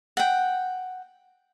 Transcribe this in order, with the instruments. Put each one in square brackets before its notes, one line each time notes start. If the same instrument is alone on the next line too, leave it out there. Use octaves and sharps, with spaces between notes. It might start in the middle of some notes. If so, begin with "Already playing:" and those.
[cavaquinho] F#5 G5